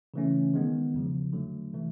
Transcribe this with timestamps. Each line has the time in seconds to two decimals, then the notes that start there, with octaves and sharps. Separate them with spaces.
0.14 C#3 E3 A3 C#4
0.54 D#3 G#3 B3
0.94 E2 C#3 F3
1.33 D3 F#3 A3
1.73 C3 E3 A3